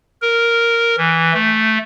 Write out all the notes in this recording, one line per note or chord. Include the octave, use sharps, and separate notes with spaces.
A#4
E3
A3